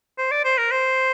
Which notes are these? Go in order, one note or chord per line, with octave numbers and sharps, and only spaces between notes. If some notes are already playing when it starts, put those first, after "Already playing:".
C5
D5
C5
A#4
C5